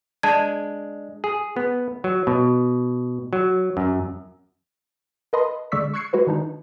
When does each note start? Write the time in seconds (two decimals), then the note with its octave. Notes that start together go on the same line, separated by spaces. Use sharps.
0.23 G#3 D4 A5 G#6
1.24 G#4
1.56 B3
2.04 F#3
2.27 B2
3.33 F#3
3.77 F#2
5.33 A#4 B4 D#5 A5 B5 C6
5.72 D3 G#3 D5 C#6 E6 B6
5.94 C#6 E6 F#6 G#6 C7 C#7
6.13 G#3 F#4 B4 C5
6.27 D#3 D4 D#4